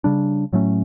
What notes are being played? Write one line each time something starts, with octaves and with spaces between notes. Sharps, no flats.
C#3 G3 D4
A2 F#3 A3 C#4